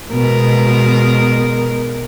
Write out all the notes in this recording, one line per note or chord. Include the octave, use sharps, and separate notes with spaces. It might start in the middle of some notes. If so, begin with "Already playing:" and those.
B2 G#3 A#4